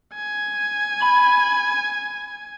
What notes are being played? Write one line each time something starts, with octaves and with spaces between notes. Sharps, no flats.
G#5
B5